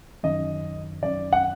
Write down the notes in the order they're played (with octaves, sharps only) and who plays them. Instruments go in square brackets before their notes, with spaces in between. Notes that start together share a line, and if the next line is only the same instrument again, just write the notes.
[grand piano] F#2 D#3 D#5
F#2 D#3 D5
F#5